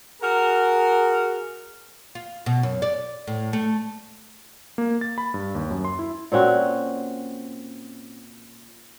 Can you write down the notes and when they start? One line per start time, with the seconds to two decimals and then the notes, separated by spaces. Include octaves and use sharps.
0.22 F#4 G#4 A#4
2.15 F4
2.46 B2
2.63 F#2
2.82 D5
3.27 A2
3.53 A3
4.78 A#3
5.01 A6
5.18 B5
5.34 G2
5.55 D#2
5.71 F#2
5.85 C6
5.99 E4
6.32 A#2 C4 C#4 F#4